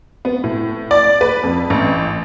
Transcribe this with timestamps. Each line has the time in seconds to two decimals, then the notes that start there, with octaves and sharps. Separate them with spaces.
0.25 B3
0.44 A2
0.91 D5
1.21 B4
1.43 F2
1.70 A1